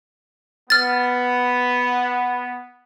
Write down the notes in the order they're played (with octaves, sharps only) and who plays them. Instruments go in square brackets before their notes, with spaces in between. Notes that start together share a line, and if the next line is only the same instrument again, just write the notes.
[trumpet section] B3 [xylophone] F6 A6